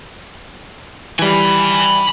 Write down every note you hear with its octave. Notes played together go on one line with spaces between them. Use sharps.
E3 G3 G#5 B5